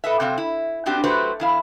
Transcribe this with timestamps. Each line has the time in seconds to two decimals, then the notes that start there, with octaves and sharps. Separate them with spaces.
0.04 A4 B4 D#5 E5
0.20 C3 F#3 C4 F5
0.38 E4
0.86 B3 C4 D4 F#4 G4
1.04 F#3 A3 F#4 G4 B4 C5
1.40 E2 E4 F5